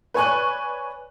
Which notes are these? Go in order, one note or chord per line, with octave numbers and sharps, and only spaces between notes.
B4 C#5 D5 G#5 C#6 F#6